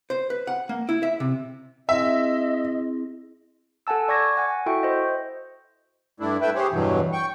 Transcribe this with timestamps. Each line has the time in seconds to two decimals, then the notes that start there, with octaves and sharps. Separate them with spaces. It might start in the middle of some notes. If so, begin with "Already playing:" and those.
0.10 C5
0.30 B4
0.47 F#5
0.69 A#3
0.89 E4
1.03 E5
1.20 C3
1.89 C4 E4 G#4 D#5 E5
3.87 A4 F#5 G#5 A5 E6
4.08 D5 C#6 G#6 A#6
4.37 F#5 G#5
4.66 E4 F#4 A4 E5 G5 C#6
4.83 C5 D#5
6.20 G2 A3 D4 E4
6.41 A3 E4 B4 E5 G5
6.55 G4 G#4 C5 C#5
6.72 E2 G2 B2 E3 F#3
7.13 G5 C#6